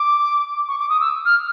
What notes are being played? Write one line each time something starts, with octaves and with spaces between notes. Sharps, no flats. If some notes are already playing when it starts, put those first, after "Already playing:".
Already playing: D6
C#6
D6
D#6
E6
F6